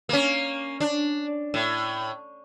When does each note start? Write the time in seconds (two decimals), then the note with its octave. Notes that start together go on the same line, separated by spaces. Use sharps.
0.09 A#3 C#4
0.80 D4
1.54 A2